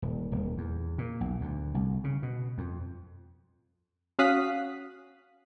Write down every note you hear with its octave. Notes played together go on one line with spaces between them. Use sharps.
D#1
D#1
E2
A#2
B1
D2
C2
C#3
B2
F2
C#4 F#4 F5 D#6 F#6 B6